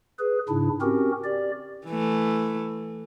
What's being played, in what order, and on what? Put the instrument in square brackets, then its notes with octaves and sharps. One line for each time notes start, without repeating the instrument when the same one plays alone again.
[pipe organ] G#4 B4
G#2 C#3 D4 E4
C4 C#4 F#4 G4 A#4
G4 D5
[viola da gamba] E3 A3